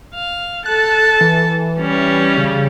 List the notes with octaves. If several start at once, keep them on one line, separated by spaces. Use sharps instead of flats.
F5
A4 A5 F#6
E3
G3 C#4
C#3